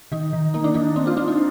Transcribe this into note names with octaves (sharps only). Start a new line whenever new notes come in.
D#3 D#4
D#3
A#3 D#4
D4
D#3 D#4
C4 D#4
D4 F4
C4 D4 F4
D#4